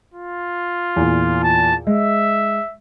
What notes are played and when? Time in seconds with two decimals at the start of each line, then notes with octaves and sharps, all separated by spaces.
0.14 F4
0.96 E2 A#2
1.43 A5
1.87 G#3 E5